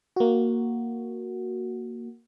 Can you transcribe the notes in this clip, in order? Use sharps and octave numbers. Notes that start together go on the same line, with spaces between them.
A#3 F#4